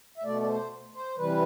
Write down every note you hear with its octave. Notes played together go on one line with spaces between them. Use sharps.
E5
B2 A3 D5
D5
C5
C5
C3 E3 G3 B4